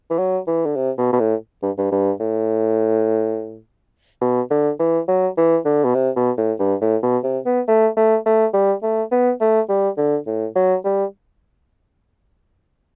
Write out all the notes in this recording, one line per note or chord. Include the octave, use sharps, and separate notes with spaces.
E3
F#3
E3
D3
C3
B2
B2
A2
G2
G2
G2
A2
B2
D3
E3
F#3
E3
D3
B2
C3
B2
A2
G2
A2
B2
C3
B3
A3
A3
A3
G3
A3
B3
A3
G3
D3
A2
F#3
G3